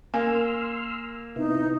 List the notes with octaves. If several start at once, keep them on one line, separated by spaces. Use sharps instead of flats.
A#3 G#5 C6 E6 F6
C3 B3 D#4 E4